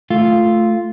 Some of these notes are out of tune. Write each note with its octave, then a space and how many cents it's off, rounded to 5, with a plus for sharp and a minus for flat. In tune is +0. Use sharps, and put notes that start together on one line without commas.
A3 +0 F4 -5